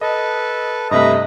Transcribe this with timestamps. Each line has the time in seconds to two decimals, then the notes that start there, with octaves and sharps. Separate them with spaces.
0.01 A4 B4 D#5
0.91 G2 C3 A3 B4 D#5 E5 A#5 B5